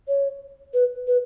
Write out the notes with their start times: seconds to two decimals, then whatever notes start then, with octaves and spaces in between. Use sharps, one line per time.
0.08 C#5
0.74 B4
1.07 B4